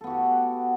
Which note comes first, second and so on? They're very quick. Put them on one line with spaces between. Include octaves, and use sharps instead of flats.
A4 B3 F#4 G4